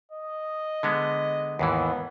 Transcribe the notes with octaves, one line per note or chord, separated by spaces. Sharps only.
D#5
D3 G#3 B3
D#2 G#2 E3 B3